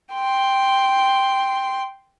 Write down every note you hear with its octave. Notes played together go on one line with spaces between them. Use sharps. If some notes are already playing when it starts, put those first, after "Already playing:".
G5 C6